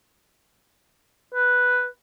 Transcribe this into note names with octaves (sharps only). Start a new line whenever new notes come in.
B4